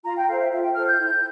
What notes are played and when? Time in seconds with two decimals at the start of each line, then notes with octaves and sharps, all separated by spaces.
0.04 F4 A#5
0.17 G5
0.28 A4 C5 F5
0.39 E5
0.52 F4 E5
0.63 G5
0.74 A4 C5 F6
0.86 G6
0.98 E4